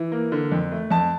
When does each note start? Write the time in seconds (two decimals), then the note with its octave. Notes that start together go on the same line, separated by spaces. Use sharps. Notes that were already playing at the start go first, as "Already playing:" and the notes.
Already playing: E3
0.12 A#3
0.32 D3
0.52 F2
0.72 A3
0.91 F2 A5